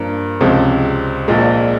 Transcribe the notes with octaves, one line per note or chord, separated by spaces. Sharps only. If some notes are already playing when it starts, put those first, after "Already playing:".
Already playing: G2 F3 A#3
C#2 C3 F3 G#3
A#1 A#2 G#3